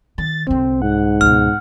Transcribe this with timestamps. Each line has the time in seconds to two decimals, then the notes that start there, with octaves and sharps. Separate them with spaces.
0.18 D#3 A6
0.47 C2 D3 C4
0.82 G#2 F#5
1.21 C#2 B2 F6